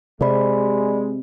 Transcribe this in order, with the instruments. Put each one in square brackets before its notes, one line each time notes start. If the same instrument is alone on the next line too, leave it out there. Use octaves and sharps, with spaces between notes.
[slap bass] C3 [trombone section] G#3 [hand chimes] D5 B5